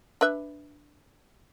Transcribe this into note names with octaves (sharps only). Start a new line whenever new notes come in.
D4 B4 E5